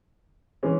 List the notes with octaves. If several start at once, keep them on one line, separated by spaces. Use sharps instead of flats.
E3 G#3 C#4